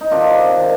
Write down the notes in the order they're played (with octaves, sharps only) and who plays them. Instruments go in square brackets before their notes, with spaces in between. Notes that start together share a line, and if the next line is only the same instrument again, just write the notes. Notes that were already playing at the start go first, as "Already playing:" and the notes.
[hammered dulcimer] D#4
C3 D#3 D4 F4
C3 D#3